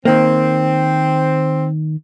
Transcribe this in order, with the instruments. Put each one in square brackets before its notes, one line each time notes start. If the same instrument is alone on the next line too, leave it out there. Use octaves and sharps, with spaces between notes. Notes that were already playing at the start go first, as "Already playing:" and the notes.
[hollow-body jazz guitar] D#3 A#3 [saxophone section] C4